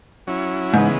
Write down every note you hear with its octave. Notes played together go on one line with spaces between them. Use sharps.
F#3 C#4 E4
G#2 C#3 E3 G#3 B3